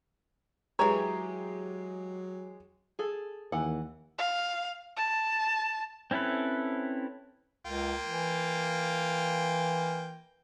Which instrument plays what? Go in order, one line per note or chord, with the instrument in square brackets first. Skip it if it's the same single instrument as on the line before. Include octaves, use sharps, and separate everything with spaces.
[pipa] E3 C#5 [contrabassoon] F#3 [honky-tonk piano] G#3 G4 G#4 [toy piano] A#5
[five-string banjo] G#4 A4
[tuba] D#2 [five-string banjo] E3 F#5
[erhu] F5
A5
[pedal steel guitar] C4 C#4 E4 A4 B4
[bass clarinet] C#2 [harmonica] A#3 F4 G5
[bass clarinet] E3